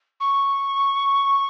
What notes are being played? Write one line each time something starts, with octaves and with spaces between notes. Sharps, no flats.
C#6